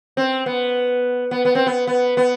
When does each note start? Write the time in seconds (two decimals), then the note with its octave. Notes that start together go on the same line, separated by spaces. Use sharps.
0.17 C4
0.46 B3
1.31 B3
1.45 B3
1.55 C4
1.66 B3
1.87 B3
2.17 B3